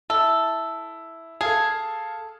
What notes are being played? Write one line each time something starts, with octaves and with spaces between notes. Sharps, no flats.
E4 A4
G#4 A4 F5 A5